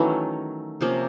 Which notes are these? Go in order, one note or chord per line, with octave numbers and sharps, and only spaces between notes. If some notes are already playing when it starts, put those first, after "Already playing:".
Already playing: D#3 E3 F#3 A3 C#4
C3 F3 A#3 C#4